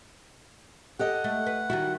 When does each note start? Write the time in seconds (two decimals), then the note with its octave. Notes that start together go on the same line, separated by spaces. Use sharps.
0.99 G4 A4 D#5 F#5
1.24 A3
1.47 B4
1.70 D#3 G3 E4 F#4